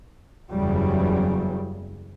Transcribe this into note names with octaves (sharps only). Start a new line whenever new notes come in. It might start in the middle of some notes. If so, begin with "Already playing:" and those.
F#1 E2 C#3 E3 F#3 G3